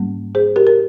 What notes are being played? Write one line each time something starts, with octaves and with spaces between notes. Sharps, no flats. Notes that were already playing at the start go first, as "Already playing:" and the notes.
Already playing: G#2 G3 A#3 C#4
G#4 C5
G4 A#4
A#4